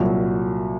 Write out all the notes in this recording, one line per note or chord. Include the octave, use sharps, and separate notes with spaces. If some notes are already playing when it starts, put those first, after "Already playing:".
Already playing: C2 A#2 F#3